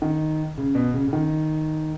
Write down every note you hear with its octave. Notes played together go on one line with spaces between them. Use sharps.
D#3
C#3
B2
C#3
C#3
D#3